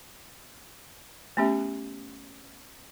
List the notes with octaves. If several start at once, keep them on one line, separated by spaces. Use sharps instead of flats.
A3 B3 C#4 G4 E5